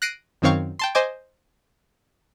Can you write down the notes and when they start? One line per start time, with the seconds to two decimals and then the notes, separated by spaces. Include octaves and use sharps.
0.02 F#6 A#6 C7 D7 D#7
0.42 F#2 D#3 C4 C#5 F5 C#6
0.79 G5 A5 C6
0.95 C5 D#5 G#5 D6